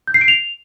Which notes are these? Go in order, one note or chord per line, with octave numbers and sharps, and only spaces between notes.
G6
C7
D7
F7